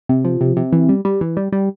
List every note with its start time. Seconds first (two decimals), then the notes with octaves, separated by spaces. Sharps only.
0.09 C3
0.25 F3
0.41 C3
0.57 C3
0.73 E3
0.89 G3
1.05 G3
1.21 E3
1.37 G3
1.53 G3